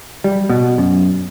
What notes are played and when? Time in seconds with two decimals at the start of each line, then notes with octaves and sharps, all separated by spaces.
0.24 G3
0.50 B2
0.78 F#2